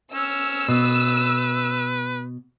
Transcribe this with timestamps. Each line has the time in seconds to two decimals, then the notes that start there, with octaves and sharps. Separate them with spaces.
0.14 C#4 E6
0.69 B2 B4